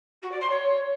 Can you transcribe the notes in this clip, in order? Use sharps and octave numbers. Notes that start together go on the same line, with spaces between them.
F#4
D5
C6
C#5